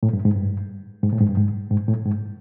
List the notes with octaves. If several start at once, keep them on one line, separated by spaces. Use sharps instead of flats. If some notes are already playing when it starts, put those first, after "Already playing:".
A2
G2
G#2
G2
G#2
A2
G#2
G2
G#2
G#2
A2
G#2